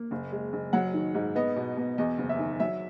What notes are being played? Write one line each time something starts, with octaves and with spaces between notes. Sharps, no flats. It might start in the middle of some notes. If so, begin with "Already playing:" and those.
Already playing: A#3
F#1
G#3
F#1
F#3 F#5
D#3
G#2
B3 D#5
B2
B2
E2 D#5
F#1
E5
D#3
F#3 E5